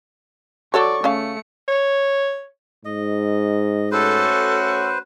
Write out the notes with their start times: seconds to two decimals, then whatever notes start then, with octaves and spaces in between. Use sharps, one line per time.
0.74 F#3 A4 C#5 D5 C#6
1.04 C#3 A3 C#4 F5 C#7
1.68 C#5
2.85 G#2 D#5
3.91 A3 C#4 F#4 A4 B4 C5